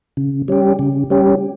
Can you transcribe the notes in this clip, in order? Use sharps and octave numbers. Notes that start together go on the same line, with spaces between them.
C#3
G3 C#4 G4
C#3
G3 C#4 G4